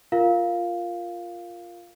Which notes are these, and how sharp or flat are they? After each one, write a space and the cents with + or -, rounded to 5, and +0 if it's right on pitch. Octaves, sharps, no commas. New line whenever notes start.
F4 +0 A#4 +0 F5 +0